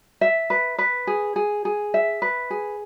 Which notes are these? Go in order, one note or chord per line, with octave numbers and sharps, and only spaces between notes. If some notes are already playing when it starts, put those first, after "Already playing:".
E5
B4
B4
G#4
G#4
G#4
E5
B4
G#4